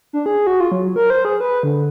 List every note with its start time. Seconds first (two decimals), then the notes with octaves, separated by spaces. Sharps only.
0.13 D4
0.26 G#4
0.47 F#4
0.60 F4
0.72 F#3
0.96 A#4
1.10 C5
1.25 G#4
1.41 B4
1.63 D3